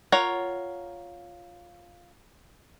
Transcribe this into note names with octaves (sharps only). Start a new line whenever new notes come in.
F4 A#4 C#5 F#5